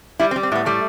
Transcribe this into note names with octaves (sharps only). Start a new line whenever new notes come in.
G3 E4
C4
G3
C4
A2 B3
G3 A3